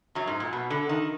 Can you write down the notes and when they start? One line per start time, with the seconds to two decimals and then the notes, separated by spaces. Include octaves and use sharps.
0.15 F#2 F#3
0.27 G#2
0.40 A#2
0.53 B2
0.70 D3
0.89 D#3